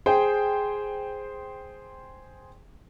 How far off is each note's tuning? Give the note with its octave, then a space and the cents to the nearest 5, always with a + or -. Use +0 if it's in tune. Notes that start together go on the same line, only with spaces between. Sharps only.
G#4 +0 C5 +0 G5 +0